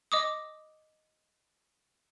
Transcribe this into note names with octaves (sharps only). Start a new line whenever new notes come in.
D#5 D6 D#6